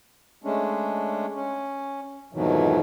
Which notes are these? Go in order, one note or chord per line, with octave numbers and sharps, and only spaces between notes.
G#3 A3 C#4 D4
C#4
F2 G#2 B2 D#3 E3 F#3